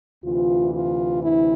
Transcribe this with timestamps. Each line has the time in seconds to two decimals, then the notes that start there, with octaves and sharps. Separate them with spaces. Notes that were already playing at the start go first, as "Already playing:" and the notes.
0.24 D2 C3 E3 F4
0.73 F4
1.23 E4